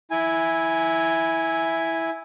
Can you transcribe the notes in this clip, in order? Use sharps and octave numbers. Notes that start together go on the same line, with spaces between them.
E4 G#5